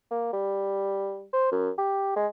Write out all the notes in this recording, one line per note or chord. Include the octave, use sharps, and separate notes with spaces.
A#3
G3
C5
F#2
G4
G#3